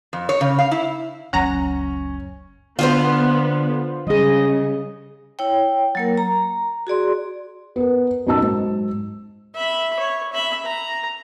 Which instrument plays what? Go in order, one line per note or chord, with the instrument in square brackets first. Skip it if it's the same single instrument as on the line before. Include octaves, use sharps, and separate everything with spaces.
[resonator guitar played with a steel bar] F2
C#5
C#3
F5
E4
[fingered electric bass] F#1 C#2 F#3 [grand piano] C#4 [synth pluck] F#5 A#5 A#6
[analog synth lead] D3 [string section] B3 [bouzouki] F4 F#4 C5
[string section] C#3 [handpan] G3 G#4 [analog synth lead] D#5
[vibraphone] E4 C#5 G5
F#3 A#3 A#4
A#5
F#4 G#4 D5 C6
[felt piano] B3 A#4
F#2 B2 D#4 A5 E6
G#2 F#3
[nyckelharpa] E5 B5
C#5
E5 B5
A#5